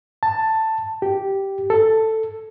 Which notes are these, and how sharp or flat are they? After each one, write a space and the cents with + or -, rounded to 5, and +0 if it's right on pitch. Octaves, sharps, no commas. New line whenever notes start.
A5 +10
G4 -5
A4 +5